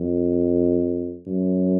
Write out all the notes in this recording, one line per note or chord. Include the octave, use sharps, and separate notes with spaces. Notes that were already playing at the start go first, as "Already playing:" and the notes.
Already playing: F2
F#2